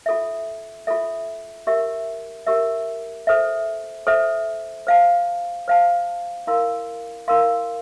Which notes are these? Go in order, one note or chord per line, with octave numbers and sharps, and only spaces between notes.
F4 A4 E5
F4 A4 E5
G4 A#4 E5
G4 A#4 E5
A4 C5 E5
A4 C5 E5
C5 F5 A5
C5 F5 A5
E4 A#4 F5 C6
E4 A#4 F5 C6